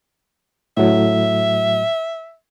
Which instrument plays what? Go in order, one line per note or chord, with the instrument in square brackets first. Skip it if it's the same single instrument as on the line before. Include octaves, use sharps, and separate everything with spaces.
[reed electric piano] A2 F#3 [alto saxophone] E5